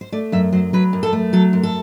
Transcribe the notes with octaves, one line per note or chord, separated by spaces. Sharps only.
C5
A3 D5
F#2 E5
F#3 C5
F#3 B4
F#2
A4
A3
F#3 A4
F#2
A4